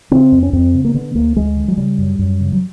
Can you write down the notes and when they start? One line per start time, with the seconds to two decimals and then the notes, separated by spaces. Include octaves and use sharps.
0.11 C#3 C4
0.32 F2
0.43 C#4
0.53 F2 C4
0.74 C#3
0.85 A#3
0.94 D3 B3
1.15 D2 A#3
1.36 D2 G#3
1.57 D3
1.68 F#3
1.77 C#3 G3
1.98 F#2
2.19 F#2
2.40 C#3
2.52 F#3